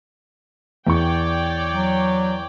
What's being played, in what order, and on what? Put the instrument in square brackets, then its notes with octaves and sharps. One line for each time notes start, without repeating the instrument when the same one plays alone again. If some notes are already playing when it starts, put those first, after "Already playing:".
[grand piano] E2 C#6 [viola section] C#5 D5 G5
[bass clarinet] F#3